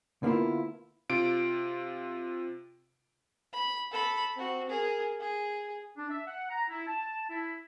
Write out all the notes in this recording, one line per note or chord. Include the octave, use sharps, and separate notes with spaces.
D3 A#3 B3 E4 F4
C3 F4 D7
B5
A4 B5
C4 F#4
G#4 A#4
G#4
D4
E5
F#5
A#5
E4
A5
E4